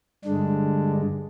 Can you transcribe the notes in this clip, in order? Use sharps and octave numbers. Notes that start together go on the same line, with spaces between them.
G2 D3 G#3 D4